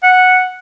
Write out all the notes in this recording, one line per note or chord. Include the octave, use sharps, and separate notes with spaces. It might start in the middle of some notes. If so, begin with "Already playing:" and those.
F#5